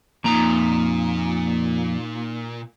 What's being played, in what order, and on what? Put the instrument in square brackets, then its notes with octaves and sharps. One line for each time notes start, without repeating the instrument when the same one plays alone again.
[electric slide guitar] F2 A#5 [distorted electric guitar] A#2 [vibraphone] A#3 D#4